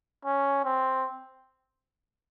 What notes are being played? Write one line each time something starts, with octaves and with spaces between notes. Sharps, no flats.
C#4
C4